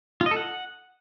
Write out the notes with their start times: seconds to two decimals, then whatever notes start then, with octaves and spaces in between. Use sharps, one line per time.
0.21 F4
0.26 D#5
0.31 A4
0.37 F#5